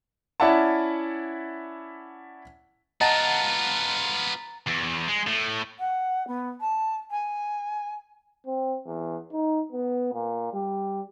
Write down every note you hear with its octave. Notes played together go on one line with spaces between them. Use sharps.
C#4 E4 D5 E5 F#5 A5
B3 F4 D#5 F#5 A5 A#5 A6
E2
G#3
A2
F#5
B3
A5
G#5
C4
E2
D#4
B3
A#2
G3